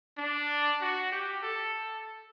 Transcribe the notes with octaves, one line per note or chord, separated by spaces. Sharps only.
D4
F#4
G4
A4